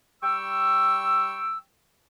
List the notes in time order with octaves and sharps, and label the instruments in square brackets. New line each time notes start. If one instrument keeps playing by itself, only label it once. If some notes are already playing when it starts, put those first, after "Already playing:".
[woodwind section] G3 G5 C#6 E6